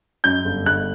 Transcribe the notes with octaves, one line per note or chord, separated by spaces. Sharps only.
F#2 G6
G1
G1 F#6